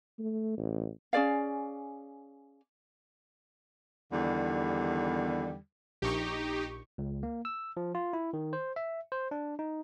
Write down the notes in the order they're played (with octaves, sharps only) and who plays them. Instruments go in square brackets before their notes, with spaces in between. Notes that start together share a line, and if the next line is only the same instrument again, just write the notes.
[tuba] A3
A1
[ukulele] C#4 G#4 D5 F5
[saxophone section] E2 D3 D#3 G3
[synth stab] A#1 C#6 [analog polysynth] D#4 G4
[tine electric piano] C#2
A#3
E6
F3
F4
E4
D#3
C5
E5
C5
D4
D#4